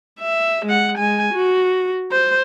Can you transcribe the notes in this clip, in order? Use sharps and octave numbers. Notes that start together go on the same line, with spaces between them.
E5
G#3 F#5
G#3 G#5
F#4
C5